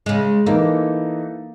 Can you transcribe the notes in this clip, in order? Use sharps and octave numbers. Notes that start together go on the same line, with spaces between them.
C#3 G#3
E3 A#3 D#4 A4